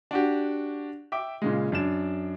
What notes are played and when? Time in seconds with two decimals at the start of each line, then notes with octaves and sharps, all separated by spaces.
0.11 D4 F#4 G4
1.12 E5 G5 D6
1.42 A#2 C#3 G#3
1.72 F#2 D4 E7